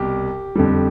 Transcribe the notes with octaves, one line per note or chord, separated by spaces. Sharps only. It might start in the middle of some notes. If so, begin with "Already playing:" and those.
Already playing: C2 B2 G3 G4
F2 D3 G3